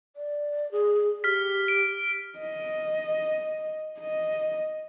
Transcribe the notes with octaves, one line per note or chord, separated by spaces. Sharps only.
D5
G#4
G4 F6 B6
D7
D#5
D#5